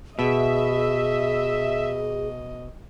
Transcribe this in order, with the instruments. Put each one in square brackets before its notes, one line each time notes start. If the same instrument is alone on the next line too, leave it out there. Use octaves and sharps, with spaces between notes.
[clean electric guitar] B2 [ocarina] G#4 [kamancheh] D#5 [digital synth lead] E5